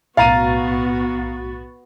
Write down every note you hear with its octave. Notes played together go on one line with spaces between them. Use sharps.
B1 A2 B3 F#4 F5 A#5 A6 D#7